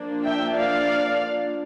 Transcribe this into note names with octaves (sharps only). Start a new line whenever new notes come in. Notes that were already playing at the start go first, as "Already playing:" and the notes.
Already playing: F3 A#3 D4
E5 G5
D5 F5